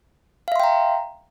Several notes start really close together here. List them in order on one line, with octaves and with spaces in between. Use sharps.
F5 E5 C6 G5 A#5